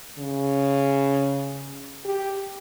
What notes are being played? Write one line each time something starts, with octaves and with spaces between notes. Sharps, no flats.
C#3
G4